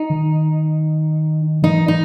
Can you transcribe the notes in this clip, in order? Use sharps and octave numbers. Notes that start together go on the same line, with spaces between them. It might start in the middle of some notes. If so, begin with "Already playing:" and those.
Already playing: D#4
D#3
E3 D#4
D#4